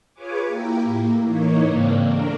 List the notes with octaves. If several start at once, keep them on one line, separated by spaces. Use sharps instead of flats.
F4 G#4 B4 C#5 G#5 D6
A#3 E4 G4 A#4
A2 A#3
E3 A#3 D#4 C#5
G#2 C#3 A#3 C4 D4
A3 D4 A#4